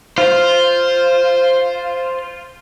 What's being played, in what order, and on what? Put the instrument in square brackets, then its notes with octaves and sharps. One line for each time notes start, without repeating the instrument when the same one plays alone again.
[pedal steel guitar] F4 [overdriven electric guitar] C5